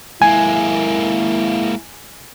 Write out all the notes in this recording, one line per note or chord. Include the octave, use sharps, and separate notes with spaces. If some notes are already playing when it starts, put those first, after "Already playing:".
G#3 A#3 E4 G#5